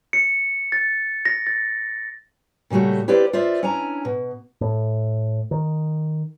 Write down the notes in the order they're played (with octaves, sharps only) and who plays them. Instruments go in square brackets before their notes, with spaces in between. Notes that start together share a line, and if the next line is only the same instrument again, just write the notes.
[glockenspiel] C#7
A6
A#6
A6
[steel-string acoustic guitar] A#2 C#3 G3 A3 F#4
E4 G4 B4 C5 D5 F5
F4 C5 D5 E5
C#4 D4 E4 G#5 A#5
B2
[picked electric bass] A2
D#3